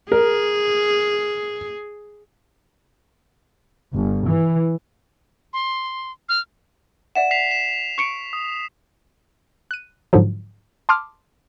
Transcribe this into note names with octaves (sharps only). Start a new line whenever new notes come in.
G#4 A#4
G1
E3
C6
F6
D5 E5 F#5 E7
B6 C7 F7
E7
C#6 C#7 D7
D#6
F#6 D#7
G#2 D3 F3 F#3
A5 C6 D6 D#6 F6